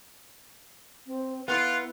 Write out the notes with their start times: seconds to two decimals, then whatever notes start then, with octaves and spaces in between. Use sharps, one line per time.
1.06 C4
1.48 B3 E4 F4 F#6